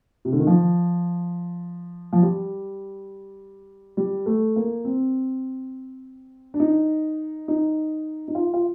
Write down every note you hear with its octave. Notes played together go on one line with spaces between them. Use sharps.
C3
D3
D#3
F3
F3
G3
G3
A3
A#3
C4
D4
D#4
D#4
D#4
F4
F4